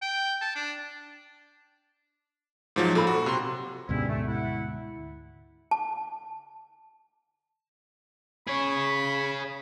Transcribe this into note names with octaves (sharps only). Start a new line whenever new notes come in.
G5
A5
D4
G#2 F3 F#3
A#2 A4 B5
F#4
C3 C6
D2 G#2 B2 G3 C#4 E4
A3
E4 F#5
A5
G#4 C#5 B5